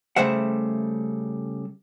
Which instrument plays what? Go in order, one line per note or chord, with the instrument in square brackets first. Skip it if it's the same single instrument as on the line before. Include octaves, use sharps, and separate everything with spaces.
[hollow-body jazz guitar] C#3 G3 A3 C5 E5 F#5